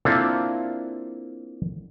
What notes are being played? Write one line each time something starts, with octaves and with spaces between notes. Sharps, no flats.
A#3 C4 D4 E4 F4 A4